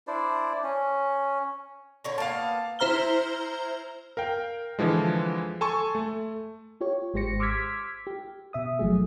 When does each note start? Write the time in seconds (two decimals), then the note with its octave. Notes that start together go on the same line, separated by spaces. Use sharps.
0.07 D4 E4 C5 D5
0.64 C#4
2.04 D3 C#5 A#5
2.18 A#3 B3 F5 A5
2.79 E4 C5 A#5 F6 G7
4.17 A#4 F5 G5
4.79 D3 E3 F3 G#3
5.61 A4 G#5 A5 C6 C#6
5.95 A3
6.81 F4 G4 C#5
7.14 G#1 G#3 G4 C5 A#6 C#7
7.39 C6 D6 E6 F6 G#6 B6
8.07 G4
8.53 B2 E5 D#6
8.79 G1 F3 F#3 A3 G#4